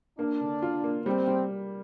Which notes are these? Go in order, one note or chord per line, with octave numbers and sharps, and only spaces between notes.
A#3 D4
D3
F4
A#3
G3 C4
G3